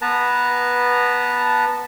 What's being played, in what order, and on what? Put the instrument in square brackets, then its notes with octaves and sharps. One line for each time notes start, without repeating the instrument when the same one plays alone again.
[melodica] B3 B4 A5 A#5